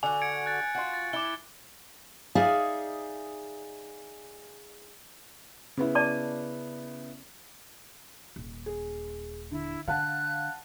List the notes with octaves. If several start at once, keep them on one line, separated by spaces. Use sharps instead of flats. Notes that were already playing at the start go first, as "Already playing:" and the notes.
D3 F#4 G#5
G#6 C#7 D7
F#6 A6
F4 F#4
A6
E4 D6 G7
D#4 G#4 D5 E5 F5 G#5
C#3 B3 E4
D5 A5 D6
D#1
G#4
D3 E4
D3 F5 F#5 A5 F#6